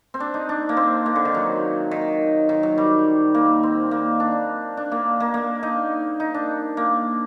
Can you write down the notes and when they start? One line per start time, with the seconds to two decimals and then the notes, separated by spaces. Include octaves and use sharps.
0.14 C4
0.20 D4
0.34 D#4
0.49 D4
0.69 A#3
0.77 C4
1.06 A#3
1.16 D3
1.25 D#3
1.34 F#3
1.91 D#3
2.49 D#3
2.63 F#3
2.78 G3
3.35 A#3
3.63 C4
3.91 A#3
4.20 D4
4.77 D4
4.92 A#3
5.20 A#3
5.34 A#3
5.63 D#4
6.20 D#4
6.34 D4
6.77 A#3